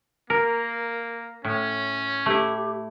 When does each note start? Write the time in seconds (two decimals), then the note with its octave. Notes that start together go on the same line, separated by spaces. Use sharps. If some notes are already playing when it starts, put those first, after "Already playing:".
0.30 A#3 A#4
1.44 A2 C#4
2.26 A3 E4 G4